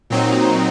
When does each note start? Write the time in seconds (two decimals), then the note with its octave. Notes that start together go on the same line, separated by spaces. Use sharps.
0.10 A#2 F#3 C4 D#4